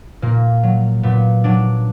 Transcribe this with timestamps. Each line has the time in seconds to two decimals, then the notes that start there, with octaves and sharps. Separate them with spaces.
0.22 A#2 A#3
0.63 F#3
1.03 A#2 B3
1.44 F#3 D4